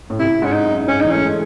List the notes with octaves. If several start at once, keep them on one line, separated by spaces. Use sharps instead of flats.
A2
C3 E4
G#2 C#4
D#4
F#2
G#2 C#4
E3 D#4
A3 C#4
G#3